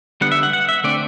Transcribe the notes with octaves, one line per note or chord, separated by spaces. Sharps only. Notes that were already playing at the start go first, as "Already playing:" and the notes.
D3 G3 B3 F#5
E5
F#5
F#5
E5
D3 A3 C4 D5